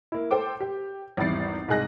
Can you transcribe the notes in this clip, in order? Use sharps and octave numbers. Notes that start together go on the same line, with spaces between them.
A#3 E4
A4 C5 G5 D6
G4
G#1 E2 G3 E4 A6 C7
C2 G#2 G#3 G#4 F#6 A#6